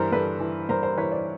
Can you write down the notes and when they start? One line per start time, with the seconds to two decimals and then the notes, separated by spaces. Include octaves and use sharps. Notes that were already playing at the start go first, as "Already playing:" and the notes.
Already playing: G2 E3 A#4 C5
0.12 G2 A4 B4
0.40 E3
0.69 G2 A#4 C5
0.83 A#4 C5
0.97 E3 B4 C#5
1.11 C5 D5